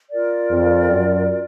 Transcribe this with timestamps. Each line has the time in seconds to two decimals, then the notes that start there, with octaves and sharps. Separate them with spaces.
0.10 F4 A#4 D5
0.50 F2
0.90 F#2